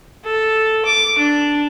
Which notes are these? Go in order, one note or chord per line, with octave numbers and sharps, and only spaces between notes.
A4
D6
D4